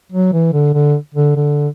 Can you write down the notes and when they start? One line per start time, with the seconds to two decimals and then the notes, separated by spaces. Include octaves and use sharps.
0.12 F#3
0.33 E3
0.53 D3
0.74 D3
1.14 D3
1.36 D3